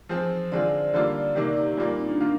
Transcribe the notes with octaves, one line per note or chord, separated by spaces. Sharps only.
F3 G#3 C4 C5
D3 G#3 C4 F4 D5
D3 G3 A#3 F4
C3 D#3 A#3 D4 G4
A#2 G3 A#3 F4
D#4
C4
D4
D#3 A#3 C4 F4